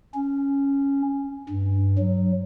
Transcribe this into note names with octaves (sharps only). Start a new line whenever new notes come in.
C#4
G2
F#3